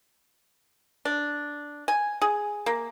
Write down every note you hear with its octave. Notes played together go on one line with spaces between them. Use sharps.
D4
G#5
G#4
A#3